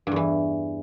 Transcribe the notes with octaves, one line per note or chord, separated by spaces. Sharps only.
E2 G2 E3